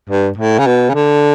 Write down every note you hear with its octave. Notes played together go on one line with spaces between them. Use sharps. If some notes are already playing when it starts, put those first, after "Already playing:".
G2
A2
C#3
B2
C#3
D3